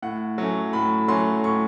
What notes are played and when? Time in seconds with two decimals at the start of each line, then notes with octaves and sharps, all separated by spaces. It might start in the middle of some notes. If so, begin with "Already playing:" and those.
0.02 A2 F#5
0.38 F#3 A3 C#4
0.73 A2 B5
1.08 F#3 A3 C#4 C6
1.44 A2 C#6